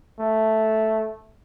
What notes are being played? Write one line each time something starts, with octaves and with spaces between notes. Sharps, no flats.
A3